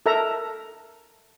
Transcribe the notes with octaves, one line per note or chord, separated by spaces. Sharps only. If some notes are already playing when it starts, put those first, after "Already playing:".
A4 A#4 E5 A#5